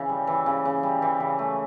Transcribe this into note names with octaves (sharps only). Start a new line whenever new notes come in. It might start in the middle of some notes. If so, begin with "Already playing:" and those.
Already playing: C#3 E3
G3
E3
C#3
C#3
G3
E3
C#3
A3